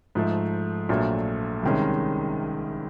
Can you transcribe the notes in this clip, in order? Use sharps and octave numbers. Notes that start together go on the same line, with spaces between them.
G#2 F3 A3
A#1 A#2 F#3 A3
C2 C3 D#3 G#3 C#4